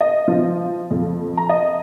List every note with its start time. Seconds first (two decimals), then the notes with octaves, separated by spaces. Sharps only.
0.01 D#5
0.28 F3
0.91 F2
1.37 A#5
1.49 D#5